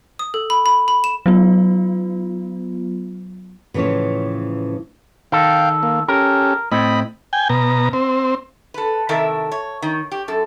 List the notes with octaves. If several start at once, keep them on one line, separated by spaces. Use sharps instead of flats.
D#6
A4
B5
B5
B5
E7
F#3 B3 F4
A2 C#3 E3 F3 C#4 C#5
D#3 A4 F5 G5
A#3
C#4 G4 A4 A#4
A2 C4 D#5 B5
G5 G#5
B2 A#5
C4
A4 B4
C3 D#3 E4 A4 A#4 E5
C#5
D#3
G4
F#2 A4